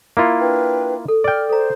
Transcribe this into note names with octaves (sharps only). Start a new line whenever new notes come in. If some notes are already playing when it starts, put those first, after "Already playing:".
A#3 E4 F4
D4 B4 G5
A4
D5 G5 F6
A4 C5 A#5